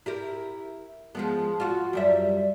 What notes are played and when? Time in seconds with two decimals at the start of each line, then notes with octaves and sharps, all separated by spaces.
0.06 E4 G4 A#4
1.15 F3 G#3 B3
1.60 F4 F#4
1.93 F#2 G3 E5